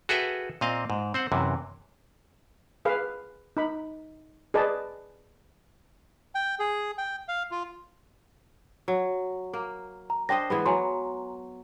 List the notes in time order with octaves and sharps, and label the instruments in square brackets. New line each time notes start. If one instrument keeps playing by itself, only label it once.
[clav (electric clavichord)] F#4 G#4 A4 B4 E5 G5
A#2 C4 D#5 F5
G#2
C4 C5 F#5
F#2 C3 E3
[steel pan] G#4 B4 F5
D#4 B5
G#4 B4 D5 D#5 A5
[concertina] G5
G#4
G5
F5
F4
[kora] F#3
A#3
[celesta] A#5
[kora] D4 C5 D#5 [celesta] G5 A#6
[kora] E3 G#3 B3
[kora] F#3 [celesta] G#5 A#5 C6